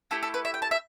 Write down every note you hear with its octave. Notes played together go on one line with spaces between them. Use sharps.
A3 E4 G4 A4
A4
B4
E5
G5
A5
E5